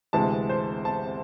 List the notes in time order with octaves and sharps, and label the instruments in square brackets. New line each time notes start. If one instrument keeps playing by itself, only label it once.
[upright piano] D2 C3 E3 G#3 A5
C5
A5